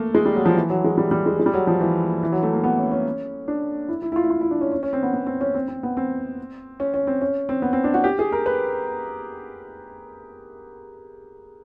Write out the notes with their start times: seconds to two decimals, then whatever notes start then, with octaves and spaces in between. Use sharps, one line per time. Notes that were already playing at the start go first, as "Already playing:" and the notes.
Already playing: A3 A#3
0.15 G#3
0.25 G3
0.36 F#3
0.46 F3
0.56 E3
0.70 F#3
0.84 G#3
0.98 G3
1.11 G3
1.26 G#3
1.39 G#3
1.46 G3
1.54 F#3
1.67 F3
1.81 E3
2.23 E3
2.32 F#3
2.43 A3
2.53 A#3
2.64 B3
2.78 C#4
2.91 C#4
3.48 D4
3.89 E4
4.02 E4
4.12 E4
4.16 F4
4.24 E4
4.30 F4
4.41 E4
4.51 D4
4.61 C#4
4.72 C#4
4.83 C#4
4.93 C4
5.03 B3
5.13 B3
5.27 C4
5.41 C#4
5.55 C4
5.68 C4
5.83 B3
5.97 C4
6.80 C#4
6.94 C#4
7.07 C4
7.21 C#4
7.49 C4
7.62 B3
7.73 C4
7.84 D4
7.94 F#4
8.04 G4
8.19 G#4
8.32 A#4
8.46 B4